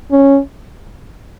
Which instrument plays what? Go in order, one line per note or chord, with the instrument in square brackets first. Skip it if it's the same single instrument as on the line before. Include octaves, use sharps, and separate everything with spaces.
[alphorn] C#4